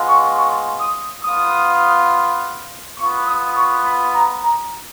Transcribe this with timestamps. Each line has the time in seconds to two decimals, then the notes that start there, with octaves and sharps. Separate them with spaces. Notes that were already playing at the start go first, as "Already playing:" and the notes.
Already playing: G#3 B3 F4
0.09 C#6
0.38 C#6
0.81 D#6
1.24 B3 F4 D#6
2.98 B3 F4 C#6
3.27 D#6
3.56 C#6
3.85 B5
4.15 A#5
4.44 A#5